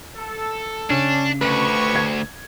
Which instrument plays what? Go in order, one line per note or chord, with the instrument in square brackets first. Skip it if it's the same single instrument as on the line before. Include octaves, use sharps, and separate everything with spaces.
[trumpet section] A4
[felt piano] C#3 [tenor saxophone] C#4 [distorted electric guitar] D4
[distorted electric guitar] D2 [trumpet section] G4 C#5 C#6 [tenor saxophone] B4
[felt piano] G#6